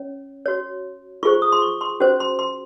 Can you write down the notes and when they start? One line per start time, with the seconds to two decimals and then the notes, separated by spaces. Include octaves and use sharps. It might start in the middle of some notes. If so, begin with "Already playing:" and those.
Already playing: C#4 C#5
0.46 F#4 C#5
1.23 F4 G#4 C5 C#6
1.42 D#6
1.52 C6
1.62 C#6
1.81 C6
2.00 C#4 F#4 C5
2.20 C6
2.39 C6